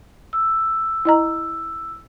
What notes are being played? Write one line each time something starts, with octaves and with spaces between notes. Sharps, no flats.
E6
E4 D#5 A#5